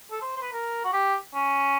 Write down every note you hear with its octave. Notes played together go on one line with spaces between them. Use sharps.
A4
C5
C5
B4
A#4
F#4
G4
C#4